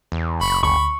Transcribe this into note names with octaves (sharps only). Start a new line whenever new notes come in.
E2
F#1 B5 C#6
D2 B5 C#6